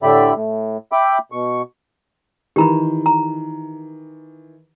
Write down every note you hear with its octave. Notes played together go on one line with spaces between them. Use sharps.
A2 D3 G4 D5 E5 B5
A2
E5 G5 B5 D6
B2 C#6
D#3 E3 G4 A#5 B5
A#5